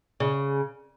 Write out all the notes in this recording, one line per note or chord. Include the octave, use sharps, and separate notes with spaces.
C#3